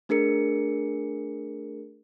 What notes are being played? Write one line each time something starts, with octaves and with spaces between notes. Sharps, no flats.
A3 D4 G#4 A#4 C#7